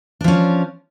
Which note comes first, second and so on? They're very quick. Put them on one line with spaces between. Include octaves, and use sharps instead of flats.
D4 F3 C#4